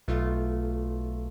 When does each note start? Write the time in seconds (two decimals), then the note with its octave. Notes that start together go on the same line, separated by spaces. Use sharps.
0.08 B1 A3 F4